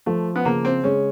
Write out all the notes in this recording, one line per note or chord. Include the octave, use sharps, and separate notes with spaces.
F3 A3
B3
C#3 A#3
C4
G#3 C#4